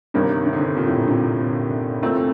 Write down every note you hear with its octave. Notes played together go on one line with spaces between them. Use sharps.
G1 G2 C3 D#3 A#3
C3
D3
C3
A#2
A2
A#2
C3
D3
D3
A#2 A3 C4